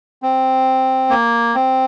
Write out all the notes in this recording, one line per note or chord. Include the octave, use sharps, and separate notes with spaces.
C4
A#3
C4